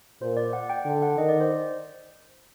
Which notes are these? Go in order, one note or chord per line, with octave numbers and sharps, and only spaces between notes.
A#2 C5
D5
F#5
G5
D3
F#5
D#3 D#5
D5
C5